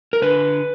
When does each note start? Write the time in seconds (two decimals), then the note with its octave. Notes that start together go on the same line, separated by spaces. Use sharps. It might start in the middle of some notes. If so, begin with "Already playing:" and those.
0.13 A#4
0.22 D3 B4